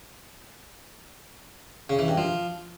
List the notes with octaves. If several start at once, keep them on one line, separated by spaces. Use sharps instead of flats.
C#3
E3
G2
F3